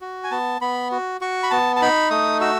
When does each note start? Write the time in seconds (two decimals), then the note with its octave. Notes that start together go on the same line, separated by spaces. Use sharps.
0.01 F#4
0.24 G#5
0.31 B3 A5
0.61 B3 B5
0.91 F#4
1.21 F#4 C#6
1.43 B5
1.51 B3 A5
1.76 A5
1.82 D#4 B5
2.11 A3 D#6
2.41 F#4 E6